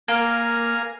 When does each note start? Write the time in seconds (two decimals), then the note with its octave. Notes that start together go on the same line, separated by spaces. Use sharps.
0.08 A#3 A#4 F5 G#5